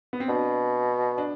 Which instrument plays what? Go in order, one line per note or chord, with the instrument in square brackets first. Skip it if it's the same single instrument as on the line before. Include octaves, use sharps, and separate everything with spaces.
[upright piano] B3
C4
[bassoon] B2 [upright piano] D4
[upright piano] D4